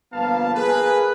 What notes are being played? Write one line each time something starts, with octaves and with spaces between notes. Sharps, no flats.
G1 F3 A#3 B3 F5 A5
G#4 A#4 B4